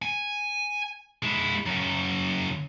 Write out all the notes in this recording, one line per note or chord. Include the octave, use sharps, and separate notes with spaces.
G#5
G#3 E4
F#2 C#3